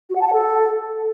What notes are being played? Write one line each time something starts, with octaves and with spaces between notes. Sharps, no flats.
F#4
F#5
A5
F#5
A4